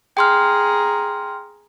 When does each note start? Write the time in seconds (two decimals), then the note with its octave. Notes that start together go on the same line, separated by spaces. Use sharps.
0.17 G#4 G5 A#5 C6 F6